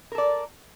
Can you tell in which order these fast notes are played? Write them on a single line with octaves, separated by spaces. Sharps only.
A#4 A4 D5